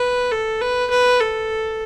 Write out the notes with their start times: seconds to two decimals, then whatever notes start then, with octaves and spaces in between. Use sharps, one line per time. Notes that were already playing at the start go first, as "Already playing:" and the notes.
Already playing: B4
0.32 A4
0.61 B4
0.90 B4
1.20 A4